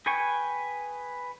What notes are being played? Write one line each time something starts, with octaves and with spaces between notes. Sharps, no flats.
G#4 B4 G5 G#5 C#6